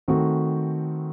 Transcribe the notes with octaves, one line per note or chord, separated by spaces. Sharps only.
D#3 A3 C4 F#4